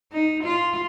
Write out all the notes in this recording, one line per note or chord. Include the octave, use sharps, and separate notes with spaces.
D#4
F4